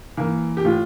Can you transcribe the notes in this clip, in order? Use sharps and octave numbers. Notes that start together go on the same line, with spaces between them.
E3 A#3
G4
A2 F4